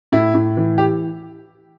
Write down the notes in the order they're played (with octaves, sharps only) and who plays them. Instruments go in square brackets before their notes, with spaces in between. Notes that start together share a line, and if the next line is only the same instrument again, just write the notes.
[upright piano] A2 E4
A2
E3
G4